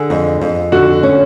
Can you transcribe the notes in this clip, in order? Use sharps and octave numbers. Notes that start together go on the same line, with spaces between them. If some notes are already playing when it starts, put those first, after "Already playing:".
Already playing: D3 G#4
F2
F2
D3 F#4
C#4